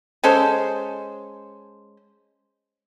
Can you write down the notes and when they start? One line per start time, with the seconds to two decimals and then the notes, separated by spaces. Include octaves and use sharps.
0.24 G#3 C#4 A4 C5